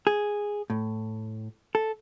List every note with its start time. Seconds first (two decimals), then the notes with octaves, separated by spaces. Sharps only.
0.07 G#4
0.70 A2
1.75 A4